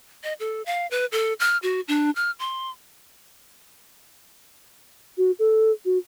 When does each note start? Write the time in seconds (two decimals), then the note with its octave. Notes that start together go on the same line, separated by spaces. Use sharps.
0.24 D#5
0.40 A4
0.66 F5
0.91 B4
1.12 A4
1.40 F6
1.63 F#4
1.88 D4
2.16 F6
2.39 C6
5.18 F#4
5.39 A4
5.85 F#4